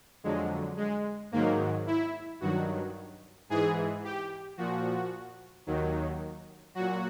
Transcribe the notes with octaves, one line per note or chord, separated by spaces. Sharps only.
F2 D3 F#3 G#3
G#3
G#2 D#3 F#3 A#3
E4
G2 D#3 F#3 F#4
G#2 E3 G#4
G4
A#2 F3 F#4
D#2 D#3 F#3
A#2 F#3 F#4